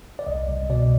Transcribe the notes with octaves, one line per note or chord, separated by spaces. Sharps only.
D5
C2 D#5
C2
B2 D5